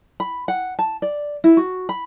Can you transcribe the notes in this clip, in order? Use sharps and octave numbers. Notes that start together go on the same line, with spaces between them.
B5
F#5
A5
D5
E4
F#4
B5